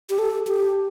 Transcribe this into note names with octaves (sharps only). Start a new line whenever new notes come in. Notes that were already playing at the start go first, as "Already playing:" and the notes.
G4
A4
G4